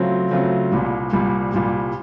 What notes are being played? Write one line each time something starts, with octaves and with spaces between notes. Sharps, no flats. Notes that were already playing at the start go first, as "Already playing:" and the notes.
Already playing: C#3 F#3 A3 C4 F4
C#3 F#3 A3 C4 F4
C2 A#2 G3
C2 A#2 G3
C2 A#2 G3